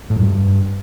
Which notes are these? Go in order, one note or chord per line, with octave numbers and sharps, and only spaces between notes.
A2
F#2
G2